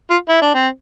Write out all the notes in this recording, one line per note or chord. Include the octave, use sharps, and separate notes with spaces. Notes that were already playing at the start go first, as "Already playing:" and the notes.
F4
E4
D4
C4